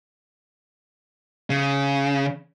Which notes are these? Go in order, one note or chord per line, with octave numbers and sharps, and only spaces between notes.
C#3